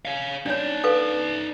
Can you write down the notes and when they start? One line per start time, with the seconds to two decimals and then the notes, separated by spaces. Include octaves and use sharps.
0.05 C#5 F5
0.46 D4 D#4 C#5 D5
0.84 A4 B4 F5